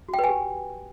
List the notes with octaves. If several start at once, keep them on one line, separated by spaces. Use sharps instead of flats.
F#4
G5
B4
G#5
G4